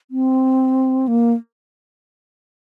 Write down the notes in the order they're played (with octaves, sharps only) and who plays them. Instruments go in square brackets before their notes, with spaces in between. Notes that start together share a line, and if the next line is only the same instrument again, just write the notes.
[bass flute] C4
A#3